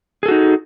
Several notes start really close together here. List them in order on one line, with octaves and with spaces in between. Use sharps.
G#4 A4 F#4 D#4